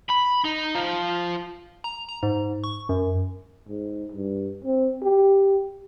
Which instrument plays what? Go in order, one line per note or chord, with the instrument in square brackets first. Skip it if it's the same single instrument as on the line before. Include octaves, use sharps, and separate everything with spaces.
[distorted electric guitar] B5
D#4
F3
[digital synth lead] A#5
A#5
G#2
C#6
F#2
[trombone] G#2
G2
C4
G4